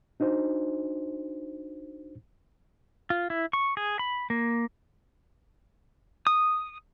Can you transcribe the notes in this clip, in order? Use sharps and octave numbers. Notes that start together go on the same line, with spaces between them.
D4 D#4 F#4 C5
F4
E4
C#6
G#4
B5
A#3
D#6